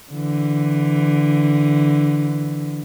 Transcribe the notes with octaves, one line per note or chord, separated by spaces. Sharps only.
D3 E3